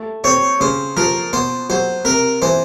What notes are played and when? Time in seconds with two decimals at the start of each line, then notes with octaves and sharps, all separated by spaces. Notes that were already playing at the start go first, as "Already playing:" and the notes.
Already playing: A3
0.24 C4 C#5
0.60 C#3 C5
0.97 F3 A#4
1.33 B2 C5
1.70 F#3 C5
2.05 C3 A#4
2.42 E3 C5